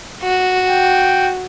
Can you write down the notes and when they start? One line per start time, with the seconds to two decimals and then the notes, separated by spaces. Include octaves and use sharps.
0.23 F#4
0.69 G5